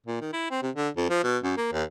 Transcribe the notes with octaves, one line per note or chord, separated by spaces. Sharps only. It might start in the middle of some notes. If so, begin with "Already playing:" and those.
A#2
D#3
E4
C4
C3
D3
F2
F3
B2
F#2
A#3
D#2